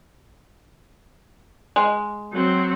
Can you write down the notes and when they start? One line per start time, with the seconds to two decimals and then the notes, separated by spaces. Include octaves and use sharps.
1.76 G#3
2.32 F#3 C4